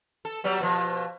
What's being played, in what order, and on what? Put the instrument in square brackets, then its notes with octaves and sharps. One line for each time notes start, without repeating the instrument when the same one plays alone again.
[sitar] A4
F#3 G3 B3
B2 F3